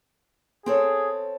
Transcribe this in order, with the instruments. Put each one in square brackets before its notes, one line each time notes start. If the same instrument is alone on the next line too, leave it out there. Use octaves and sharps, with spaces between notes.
[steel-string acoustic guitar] C4 A4 C#5 [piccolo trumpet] G#4